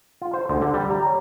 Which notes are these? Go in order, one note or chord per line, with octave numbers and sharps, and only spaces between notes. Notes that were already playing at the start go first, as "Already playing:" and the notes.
F4
C5
D2
D3
G3
A#5
C#5